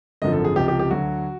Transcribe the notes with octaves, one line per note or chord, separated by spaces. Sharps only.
G#1 F#2 D3 F3 D#5
A4
G#4
C#2 C3 F3 G4
G4
G4
D2 D3 F#3 F#4